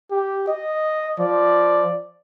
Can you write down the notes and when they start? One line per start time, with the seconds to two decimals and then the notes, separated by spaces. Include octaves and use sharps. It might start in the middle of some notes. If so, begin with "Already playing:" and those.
0.11 G4
0.48 D#5
1.19 F3 D5